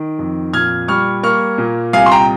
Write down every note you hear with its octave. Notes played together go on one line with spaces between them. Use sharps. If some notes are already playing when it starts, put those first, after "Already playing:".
Already playing: D#3
F2
A#2 F6 G#6
G3 C#6 F6
A#3 C#6 F6
A#2
C2 F5 G#5
C6
G5 A#5